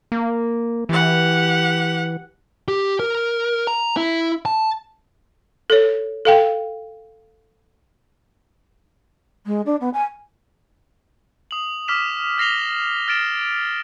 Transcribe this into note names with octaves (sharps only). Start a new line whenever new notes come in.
A#3
E3 G4 F#5
G4
A#4
A#5
E4
A5
A4 C#5
A4 F5 G5
G#3
D4
B3
G#5
D#6 F#7
D6 D#6 F6 B6 E7
F6 A#6 C7 F7 G7
F6 A6 D7 E7